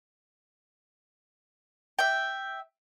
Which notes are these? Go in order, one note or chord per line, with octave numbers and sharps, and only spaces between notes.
E5 G5